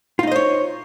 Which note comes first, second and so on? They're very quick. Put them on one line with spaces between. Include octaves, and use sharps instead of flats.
F4 D#4 D#5 C5 C#5